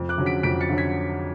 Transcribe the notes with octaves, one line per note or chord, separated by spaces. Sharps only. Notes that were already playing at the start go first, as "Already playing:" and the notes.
Already playing: F2
D6 F#6
D3 F#3 C#4
B6 D7
F2 B6 D7
A6 C#7
D3 F#3 C#4
G#6 B6